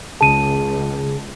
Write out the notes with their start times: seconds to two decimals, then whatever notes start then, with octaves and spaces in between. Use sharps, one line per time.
0.21 C#2 C#3 G#4 A5 D#7